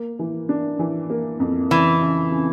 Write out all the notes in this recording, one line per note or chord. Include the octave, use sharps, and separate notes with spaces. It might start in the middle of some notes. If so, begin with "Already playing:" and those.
Already playing: A#3
E3
D4
E3
A#3
F2
C#3 E3
C#3
C#3